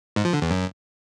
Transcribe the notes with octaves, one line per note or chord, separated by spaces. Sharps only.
G#2
F3
D3
E2
F#2